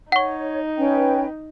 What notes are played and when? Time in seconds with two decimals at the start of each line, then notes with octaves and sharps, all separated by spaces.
0.12 D#4 C#5 F#5 C#6
0.78 C#4 B4 G5